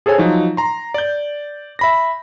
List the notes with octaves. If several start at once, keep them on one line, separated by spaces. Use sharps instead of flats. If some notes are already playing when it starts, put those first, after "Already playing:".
G#4 A4 C5 C#5 G#5
F3 F#3 D#4
A#5 C6
D5 G6
E5 B5 A#6